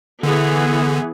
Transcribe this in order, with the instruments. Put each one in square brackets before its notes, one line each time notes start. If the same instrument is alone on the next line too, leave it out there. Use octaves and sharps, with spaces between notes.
[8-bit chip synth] D3 [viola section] E3 B3 G#4